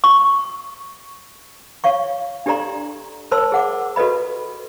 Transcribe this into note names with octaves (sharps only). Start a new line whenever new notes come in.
C#6
C#5 F5 C#6
D4 G4 A4 D5 A#5 C6
A#4 C5 C#5 A5 C6 E6
G#4 F#5 D6
F#4 A4 B4 D#5 B5